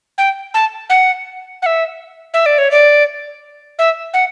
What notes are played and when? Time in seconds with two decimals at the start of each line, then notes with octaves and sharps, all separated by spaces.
0.18 G5
0.54 A5
0.90 F#5
1.62 F#5
1.66 E5
2.34 E5
2.46 D5
2.58 C#5
2.71 D5
3.79 E5
4.14 F#5